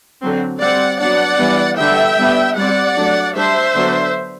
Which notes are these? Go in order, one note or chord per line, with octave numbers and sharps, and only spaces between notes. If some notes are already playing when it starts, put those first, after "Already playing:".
D3 F#3 C4
G3 C4 D5 F#5
F#3 B3 D4 D5 F#5
E3 G3 B3 D4
D3 G3 B3 D4 E5 G5
G3 B3 D4
G3 C4 D5 F#5
F#3 A3 D4
G3 D4 C5 E5
D3 F#3 B3 D4